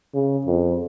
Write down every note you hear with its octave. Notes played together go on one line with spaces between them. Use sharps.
C#3
F2